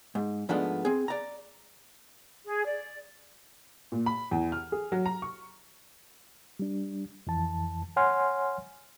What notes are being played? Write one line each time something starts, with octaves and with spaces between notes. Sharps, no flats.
G#2
G#2 F3 G#3 A3 B3 D4
C4 G#4
D5 A#5
G#4
D5
A#2
B5
E2
F6
G#4
F#3
A#5
C#6
G3 D4
F2 E3 A5
C#5 F#5 G#5 C6 F6